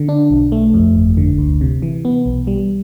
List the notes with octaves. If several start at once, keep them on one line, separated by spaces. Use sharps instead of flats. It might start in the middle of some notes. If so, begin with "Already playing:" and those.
Already playing: D3
D4
B1
A3
F2
G1
D3
D2
C3
E3
B3
B1
G3